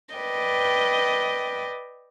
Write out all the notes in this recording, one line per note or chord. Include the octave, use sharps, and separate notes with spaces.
B4 D5 D#5 G5